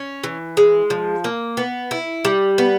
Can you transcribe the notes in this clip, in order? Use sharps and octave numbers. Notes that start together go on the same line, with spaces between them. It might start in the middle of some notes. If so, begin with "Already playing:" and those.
Already playing: C#4
E3
G#3
F3
A#3
B3
E4
G3
B3